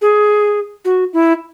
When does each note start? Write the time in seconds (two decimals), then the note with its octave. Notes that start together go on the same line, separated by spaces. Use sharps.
0.02 G#4
0.85 F#4
1.13 E4